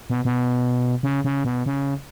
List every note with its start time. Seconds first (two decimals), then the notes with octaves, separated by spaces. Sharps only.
0.10 B2
0.25 B2
1.03 C#3
1.24 C#3
1.44 B2
1.66 C#3